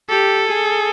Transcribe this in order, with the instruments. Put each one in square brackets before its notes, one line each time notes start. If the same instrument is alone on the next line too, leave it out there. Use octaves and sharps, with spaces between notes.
[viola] G4 [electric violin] A4
[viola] G#4